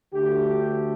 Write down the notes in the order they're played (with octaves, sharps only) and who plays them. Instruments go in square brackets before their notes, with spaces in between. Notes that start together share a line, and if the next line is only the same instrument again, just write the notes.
[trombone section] D2 D3 A3 G4